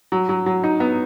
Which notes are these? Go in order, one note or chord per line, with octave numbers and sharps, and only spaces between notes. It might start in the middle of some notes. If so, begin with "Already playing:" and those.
F#3
F#3
F#3
D#4
B3